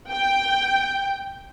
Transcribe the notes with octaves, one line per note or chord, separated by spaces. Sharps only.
G5